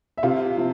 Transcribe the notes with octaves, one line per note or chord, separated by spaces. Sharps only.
E5
C3 F4 F5
F3